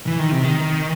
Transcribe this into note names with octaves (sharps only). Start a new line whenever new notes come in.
E3
D#3
C3
D#3